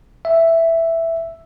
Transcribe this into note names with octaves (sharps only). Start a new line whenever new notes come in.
E5